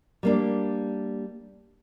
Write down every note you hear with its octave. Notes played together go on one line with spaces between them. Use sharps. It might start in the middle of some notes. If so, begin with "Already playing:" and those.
G3 A#3 D4